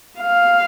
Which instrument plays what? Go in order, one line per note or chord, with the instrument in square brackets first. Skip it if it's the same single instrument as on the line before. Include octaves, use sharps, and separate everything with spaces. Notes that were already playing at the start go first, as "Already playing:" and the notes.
[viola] F5